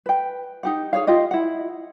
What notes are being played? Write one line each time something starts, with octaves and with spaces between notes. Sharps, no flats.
B4 G5
D#4 G4 F#5
G#4 C#5 F5
F4 G4 D#5
E4 F#5